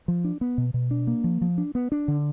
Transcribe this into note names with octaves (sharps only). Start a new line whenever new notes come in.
F3
D4
B3
B2
B2
D4
A#3
F3
F3
D4
B3
D4
D3